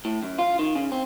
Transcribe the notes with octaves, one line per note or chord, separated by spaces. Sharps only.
A2
F#2
F4
D#3
C#3
C4